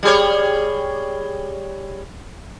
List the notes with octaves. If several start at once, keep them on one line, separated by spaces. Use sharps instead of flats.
G3 G#4 C#5